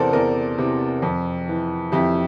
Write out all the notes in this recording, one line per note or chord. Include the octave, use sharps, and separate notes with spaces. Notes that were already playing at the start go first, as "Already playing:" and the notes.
Already playing: E2 C3 E3 A4 A#4 C5 D5
E2 A#4 D5
C3 E3
F2
E3
F2 E4 G4